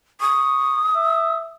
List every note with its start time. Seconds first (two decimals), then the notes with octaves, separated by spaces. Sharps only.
0.21 C#6 D#6
0.95 E5